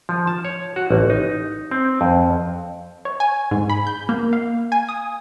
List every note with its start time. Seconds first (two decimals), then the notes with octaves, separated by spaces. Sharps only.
0.09 F3
0.27 A5
0.45 C#5
0.76 F#4
0.91 A1
1.10 D#4
1.71 C4
2.01 F2
3.05 C#5
3.20 G#5
3.51 G#2
3.70 B5
3.87 G6
4.09 A#3
4.33 F5
4.72 G#5
4.89 D#6